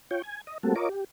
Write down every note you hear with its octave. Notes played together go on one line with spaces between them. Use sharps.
F4 C#5 G5
G#5
D#5
G3 A3 A#3 C4 F#4 A4
F4 A#4 C#5 D#5 D6
G4